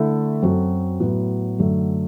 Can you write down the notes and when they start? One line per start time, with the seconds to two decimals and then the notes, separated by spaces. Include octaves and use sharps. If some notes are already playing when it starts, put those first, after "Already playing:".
Already playing: D3 A3 E4 A4
0.42 F#2 F#3 C4 F#4 A4
0.99 A2 F#3 B3 F#4
1.58 F#2 D3 F#3 A3